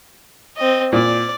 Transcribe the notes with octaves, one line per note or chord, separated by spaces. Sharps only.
C4 D#5
A#2 D5